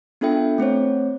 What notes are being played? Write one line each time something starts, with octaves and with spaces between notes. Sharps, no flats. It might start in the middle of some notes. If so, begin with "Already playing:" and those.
B3 D4 F4 A4 E5 G5
A3 C4 C5 C#5